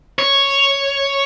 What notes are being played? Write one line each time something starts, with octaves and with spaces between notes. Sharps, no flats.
C#5